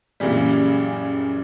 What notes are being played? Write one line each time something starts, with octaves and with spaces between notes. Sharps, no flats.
F#2 A#2 C#3 E3 G3